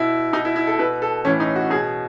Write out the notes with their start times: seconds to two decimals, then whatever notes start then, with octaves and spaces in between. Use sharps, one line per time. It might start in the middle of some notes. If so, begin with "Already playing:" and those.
Already playing: B2 E4
0.33 B2 D#4
0.45 E4
0.56 E4
0.67 A4
0.79 B2 B4
1.02 A4
1.25 A2 E3 C#4
1.40 D#4
1.56 F#4
1.70 B2 G#4